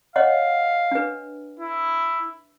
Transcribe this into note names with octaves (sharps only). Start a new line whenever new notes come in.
C#5 D#5 F5 F#5
D4 B4
E4